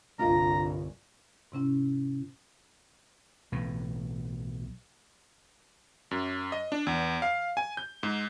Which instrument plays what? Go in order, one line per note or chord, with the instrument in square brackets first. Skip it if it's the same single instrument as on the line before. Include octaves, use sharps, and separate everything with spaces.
[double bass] G1 C2 [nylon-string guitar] D4 F4 D#5 [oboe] A#5
[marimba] G#2 C3 C#4 E4
[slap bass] B1 A2 E3
[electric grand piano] F#2
D#5
D4
E2
F5
G#5
G6
G#2